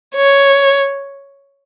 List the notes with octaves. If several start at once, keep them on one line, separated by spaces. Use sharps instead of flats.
C#5